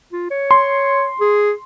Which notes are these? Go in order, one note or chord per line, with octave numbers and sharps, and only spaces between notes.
F4
C#5
C6
G#4